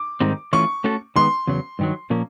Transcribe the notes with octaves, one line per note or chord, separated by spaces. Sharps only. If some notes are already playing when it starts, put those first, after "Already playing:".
Already playing: D6
G#2 D#3 G3 C4 D#4
E3 A3 C#4 F4 C#6
A3 C#4 F#4 A4
D#3 G#3 B3 C6
E2 C#3 F#3
G2 D#3 F#3
A#2 F3 A#3 C#4